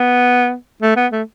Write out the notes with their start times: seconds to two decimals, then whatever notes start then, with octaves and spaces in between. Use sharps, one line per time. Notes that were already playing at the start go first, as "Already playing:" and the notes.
Already playing: B3
0.82 A3
0.96 B3
1.12 A3